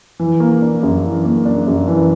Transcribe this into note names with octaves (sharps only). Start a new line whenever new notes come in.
E3
A#3
D4
F#2
E3
A#3
D4
F#2
E3